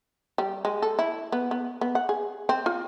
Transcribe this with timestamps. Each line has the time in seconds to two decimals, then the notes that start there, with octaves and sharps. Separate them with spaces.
0.38 G3
0.65 G#3
0.82 A4
0.99 E4
1.32 B3
1.51 B3
1.81 B3
1.95 F#5
2.09 G#4
2.49 C4
2.66 F4